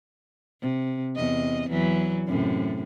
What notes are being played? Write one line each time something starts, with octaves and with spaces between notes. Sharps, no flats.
C3
E2 C3 D#5
E2 E3 F#3
F#2 A2 C3